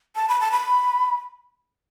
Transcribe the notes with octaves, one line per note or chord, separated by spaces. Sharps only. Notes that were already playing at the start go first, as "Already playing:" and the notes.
A5
B5
A5
B5